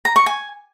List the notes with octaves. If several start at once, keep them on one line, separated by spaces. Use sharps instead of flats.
A#5
C#6
G#5